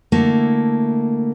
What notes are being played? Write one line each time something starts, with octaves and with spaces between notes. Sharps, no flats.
D3 A3 A#3 E4